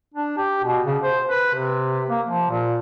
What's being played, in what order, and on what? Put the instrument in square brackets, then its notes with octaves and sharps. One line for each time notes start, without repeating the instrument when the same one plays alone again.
[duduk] D4
G4
B2
C#3
C5
B4
C3
A#3
F3
A#2